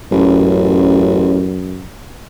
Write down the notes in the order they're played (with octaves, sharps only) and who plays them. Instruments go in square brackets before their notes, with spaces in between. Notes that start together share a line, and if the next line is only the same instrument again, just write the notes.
[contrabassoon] A1 [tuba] F#2